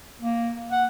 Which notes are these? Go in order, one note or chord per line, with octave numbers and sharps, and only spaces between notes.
A#3
F#5